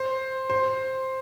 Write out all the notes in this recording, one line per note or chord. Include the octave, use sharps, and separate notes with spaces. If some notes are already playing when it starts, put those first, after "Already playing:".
Already playing: C5
C5